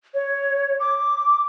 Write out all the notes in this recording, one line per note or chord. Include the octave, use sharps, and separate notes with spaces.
C#5
D6